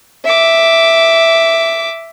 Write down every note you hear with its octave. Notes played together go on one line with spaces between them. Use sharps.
E5 D6